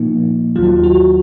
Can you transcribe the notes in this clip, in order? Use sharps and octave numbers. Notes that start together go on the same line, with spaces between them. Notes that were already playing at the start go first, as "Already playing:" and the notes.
Already playing: A#2 F3 A#3 D#4
D#2 D#3 F#3 F4
F#4